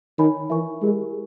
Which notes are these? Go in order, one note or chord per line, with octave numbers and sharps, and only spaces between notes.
D#3 C#5 G#5 B5
E3 A#4 E5 G#5 C#6
G#3 E4 G4 A#4